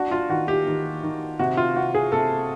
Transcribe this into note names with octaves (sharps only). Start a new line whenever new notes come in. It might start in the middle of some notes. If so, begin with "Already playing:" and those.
Already playing: D4 F#4
F4
D#3 F#4
G4
D#3
D#3
C3 F#4
F4
C3 F#4
G#4
C3 A4